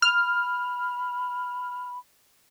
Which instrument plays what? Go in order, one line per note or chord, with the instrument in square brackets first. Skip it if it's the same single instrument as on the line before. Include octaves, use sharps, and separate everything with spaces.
[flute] B5 [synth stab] F6